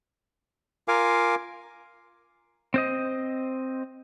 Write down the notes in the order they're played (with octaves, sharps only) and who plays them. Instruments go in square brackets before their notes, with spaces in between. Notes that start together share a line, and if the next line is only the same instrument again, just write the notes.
[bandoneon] F4 A#4 F5 G#5 D6
[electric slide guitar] C4 C5 D#5